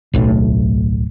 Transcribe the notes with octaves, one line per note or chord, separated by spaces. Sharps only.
D1 B1 A2